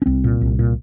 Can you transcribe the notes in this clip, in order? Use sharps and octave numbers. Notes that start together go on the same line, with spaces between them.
C#4
C2 C4
A#2
C2
A#2